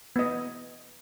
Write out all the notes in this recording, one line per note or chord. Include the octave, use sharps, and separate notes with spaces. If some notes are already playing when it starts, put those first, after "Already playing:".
B3 D#5